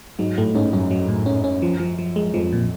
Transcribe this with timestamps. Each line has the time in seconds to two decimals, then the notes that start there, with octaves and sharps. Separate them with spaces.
0.19 G#2 F#3
0.37 A2 A3
0.54 G#2 C#4
0.73 F#2 C#4
0.91 F#3
1.08 A2
1.26 C#4
1.44 C#4
1.62 F3
1.80 F3
1.98 F3
2.16 G#3
2.34 F2 F3
2.53 A#2